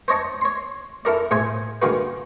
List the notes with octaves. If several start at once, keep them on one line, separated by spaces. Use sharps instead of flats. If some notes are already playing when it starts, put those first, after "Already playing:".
C5 C#5 D#5 A5 C#6
C#5 C6
E4 A4 A#4 D5
A2 G#4 C5 E5 G#5
D3 D#3 G#3 A#3 F#4 B4